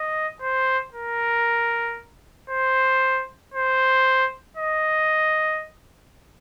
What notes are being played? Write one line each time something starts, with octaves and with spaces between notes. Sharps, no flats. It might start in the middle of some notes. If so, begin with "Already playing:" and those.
Already playing: D#5
C5
A#4
C5
C5
D#5